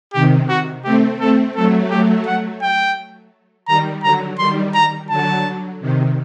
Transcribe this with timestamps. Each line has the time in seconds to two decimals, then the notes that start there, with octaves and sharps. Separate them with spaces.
0.14 C3 D#3 G4
0.49 F#4
0.84 A3 C4 G4
1.20 A3 C4 A4
1.55 F#3 A3 A4
1.91 G4
2.26 F#5
2.62 G5
3.67 D#3 G3 A#5
4.03 D3 F#3 A#5
4.39 D#3 G3 C6
4.75 A#5
5.10 D3 F#3 A5
5.81 C3 D#3